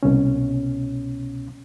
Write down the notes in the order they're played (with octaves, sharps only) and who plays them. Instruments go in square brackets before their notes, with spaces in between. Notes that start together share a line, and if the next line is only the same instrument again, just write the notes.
[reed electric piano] C2 B2 C#4